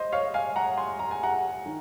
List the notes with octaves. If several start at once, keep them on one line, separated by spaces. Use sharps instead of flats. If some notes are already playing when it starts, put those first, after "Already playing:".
Already playing: C5 D#5
C#5 F5
F5 G#5
F#5 A#5
G#5 C6
A#5
G#5
F#5 A#5
D#3